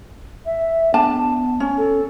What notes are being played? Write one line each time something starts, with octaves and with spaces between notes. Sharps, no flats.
E5
B3 D4 A5
C#4
A4